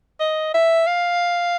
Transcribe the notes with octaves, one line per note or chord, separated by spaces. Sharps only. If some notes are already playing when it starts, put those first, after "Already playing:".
D#5
E5
F5